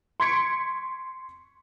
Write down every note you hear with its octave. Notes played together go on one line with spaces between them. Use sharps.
C6 C#6 G#6 B6 C#7 D7